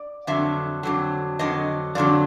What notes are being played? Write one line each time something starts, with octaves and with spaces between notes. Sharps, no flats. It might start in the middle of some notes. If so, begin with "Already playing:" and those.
Already playing: D5
F2 D3 F#3 E5
F2 D3 F#3
F2 D3 F#3 D#5
F2 D3 F#3 D5